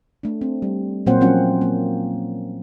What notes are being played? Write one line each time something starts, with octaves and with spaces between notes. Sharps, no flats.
A3 D4
C4
G3
A#2 F#3 A#3 C4 C5 F#5
F3 F#3 C4 C#4 F4 F#5
A#3